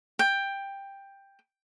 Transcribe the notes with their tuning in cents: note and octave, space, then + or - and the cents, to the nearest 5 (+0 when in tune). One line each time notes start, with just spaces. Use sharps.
G5 +10